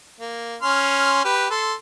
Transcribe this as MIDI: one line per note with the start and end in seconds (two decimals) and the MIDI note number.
0.20 0.56 58
0.62 1.24 61
0.62 1.24 84
0.62 1.24 89
1.25 1.47 67
1.25 1.47 71
1.51 1.73 69
1.51 1.73 84